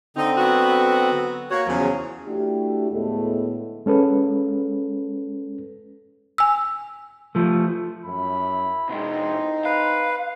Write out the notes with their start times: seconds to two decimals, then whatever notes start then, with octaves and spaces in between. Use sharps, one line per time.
0.16 D3 C4 D#4
0.37 F#3 B3 F#4
1.51 A#3 F#4 C#5
1.67 E2 C#3 F3 F#3
2.26 A3 D4 E4 F#4 G4
2.91 D2 A2 G#3 A3 B3 A4
3.86 G#3 C#4 A4 B4
6.38 G#5 E6
7.35 F3 A3
8.05 F#2 E4 B5
8.89 B2 G#3 C4 D#4 C6
9.65 B4 F5